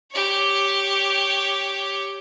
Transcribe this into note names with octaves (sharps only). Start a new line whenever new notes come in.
G4 C#5